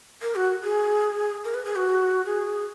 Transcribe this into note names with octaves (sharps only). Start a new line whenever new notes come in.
A#4
F#4
G#4
A#4
B4
G#4
F#4
G#4